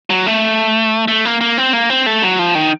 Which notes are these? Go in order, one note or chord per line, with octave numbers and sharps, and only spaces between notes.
F#3
A3
A3
A#3
A#3
C4
A#3
C4
A3
F#3
F3
D#3